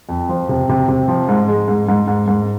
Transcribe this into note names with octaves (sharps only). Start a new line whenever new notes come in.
F2
F3
C3
C3
C3
F3
G#2
G#3
G#2
G#2
G#2
G#2